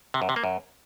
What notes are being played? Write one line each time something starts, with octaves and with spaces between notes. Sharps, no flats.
C3
F#2
C3
A#3
F#2